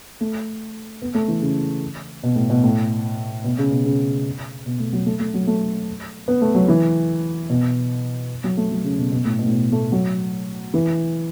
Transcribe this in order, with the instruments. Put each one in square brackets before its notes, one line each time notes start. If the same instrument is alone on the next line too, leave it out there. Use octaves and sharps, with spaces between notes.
[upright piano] A3
B3
A3
E3
C#3
B2
A2
B2
A2
B2
C#3
B2
C#3
B2
A3
F#3
A3
A3
F#3
A3
B3
A3
F#3
E3
B2
F#3
A3
F#3
C#3
B2
B2
A2
B2
A2
B2
A3
F#3
E3